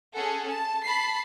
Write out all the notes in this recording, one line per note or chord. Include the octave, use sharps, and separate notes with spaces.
C#4 G#4 A4 F#5
A5
A5 B5 C7